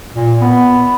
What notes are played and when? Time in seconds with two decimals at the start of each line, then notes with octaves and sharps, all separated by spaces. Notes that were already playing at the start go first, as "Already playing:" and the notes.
0.14 A#2
0.41 B3